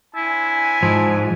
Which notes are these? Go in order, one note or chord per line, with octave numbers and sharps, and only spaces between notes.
C4 D4 E4 G#5
G#2 F3